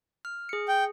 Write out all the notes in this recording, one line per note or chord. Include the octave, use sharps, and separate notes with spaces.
F6
G#4 C#7
G5